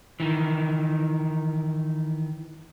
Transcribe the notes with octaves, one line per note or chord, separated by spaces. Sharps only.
D#3 E3